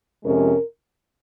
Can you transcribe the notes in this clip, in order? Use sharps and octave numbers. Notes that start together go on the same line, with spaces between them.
F2 C3 F3 G#3 C#4 A#4